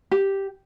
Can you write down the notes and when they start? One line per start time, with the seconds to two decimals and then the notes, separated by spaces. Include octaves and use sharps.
0.11 G4